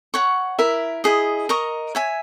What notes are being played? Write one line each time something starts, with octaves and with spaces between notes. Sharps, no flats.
C#5 F#5 C#6
E4 A#4 E5
E4 G#4 D#5
A#4 D#5 A#5 C#6
C#5 E5 G#5